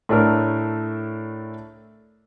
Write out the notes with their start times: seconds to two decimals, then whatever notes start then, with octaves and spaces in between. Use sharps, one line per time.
0.09 A2 A3 D4 A4 A#4